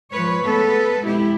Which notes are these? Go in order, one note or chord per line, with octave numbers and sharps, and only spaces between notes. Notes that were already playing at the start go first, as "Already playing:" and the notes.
F3 G#3 B4 C#5
G#3 A3 B3 A4 B4
F2 B2 G#3 E4 G4